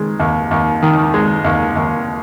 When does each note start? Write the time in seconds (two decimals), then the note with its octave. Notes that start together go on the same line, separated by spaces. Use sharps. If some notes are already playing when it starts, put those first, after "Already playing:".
Already playing: D#3 G#3
0.20 D#2
0.51 D#2
0.82 D#3
1.14 G#3
1.45 D#2
1.76 D#2